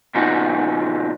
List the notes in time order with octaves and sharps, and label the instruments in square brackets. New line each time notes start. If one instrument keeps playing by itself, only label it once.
[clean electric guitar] A#2 C#3 F3 B3 D#4 F#4